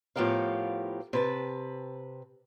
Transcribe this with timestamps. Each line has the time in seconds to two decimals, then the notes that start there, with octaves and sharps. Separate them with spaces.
0.16 A2 F3 B3 G4 A#4 F5
1.13 C3 B4 A5